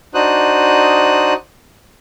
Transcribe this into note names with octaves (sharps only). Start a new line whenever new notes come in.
D4 D#4 F#4 C5 D#6 F#6